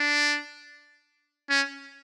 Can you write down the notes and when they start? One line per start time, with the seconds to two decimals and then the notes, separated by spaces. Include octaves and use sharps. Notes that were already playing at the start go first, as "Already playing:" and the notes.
Already playing: D4
1.50 C#4